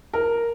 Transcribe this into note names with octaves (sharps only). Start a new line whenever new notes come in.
A#4